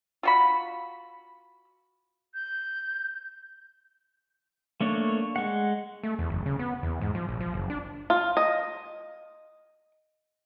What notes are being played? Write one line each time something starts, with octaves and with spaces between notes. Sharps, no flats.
F4 F#4 B5
G6
A3 A#3 D4 C#5
G#3 F#5
A3
E2
F#1
C#3
B3
E2
G#2
F3
A#1
F3
F#1
D4
F4
D#5